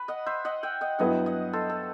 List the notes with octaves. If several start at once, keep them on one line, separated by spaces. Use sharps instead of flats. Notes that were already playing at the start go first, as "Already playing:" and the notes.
Already playing: B4
D#5 F#5
C5 E5
D#5 F#5
E5 G5
D#5 F#5
G2 F#3 B3 E4 D#5 F#5
D#5 F#5
A4 C5
A4